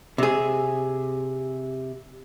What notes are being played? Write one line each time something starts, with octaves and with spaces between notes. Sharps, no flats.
C3 G#4